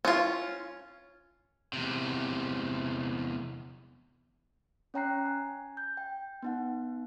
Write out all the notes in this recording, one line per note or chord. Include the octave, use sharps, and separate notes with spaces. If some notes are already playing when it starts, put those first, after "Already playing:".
C#4 F4
E2 C3
C#4 C#5 G5 A#5 F#6 C7
G#5
G6
G5
B3 D#4 F#5